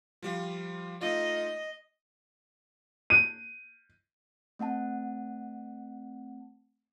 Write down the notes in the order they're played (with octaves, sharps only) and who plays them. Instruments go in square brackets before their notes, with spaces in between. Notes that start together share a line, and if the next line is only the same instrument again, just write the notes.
[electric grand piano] F3 G3 F4
[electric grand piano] A3 D#4 F4 [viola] D#5
[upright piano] D#7
[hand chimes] A3 C4 F#5 A5